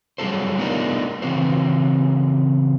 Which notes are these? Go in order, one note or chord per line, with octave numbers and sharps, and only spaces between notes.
F#3 G3 E4 G#4 A4 C5
A3 B3 D4 D#4 F4 A#4
C#3 E3 C4 F#4 C5